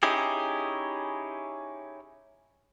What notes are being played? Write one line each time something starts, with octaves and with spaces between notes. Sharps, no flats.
C#4 D#4 E4 G4 G#4